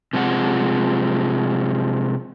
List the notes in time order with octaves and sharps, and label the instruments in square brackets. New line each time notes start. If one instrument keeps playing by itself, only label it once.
[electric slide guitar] C3 F3 G#3 F#5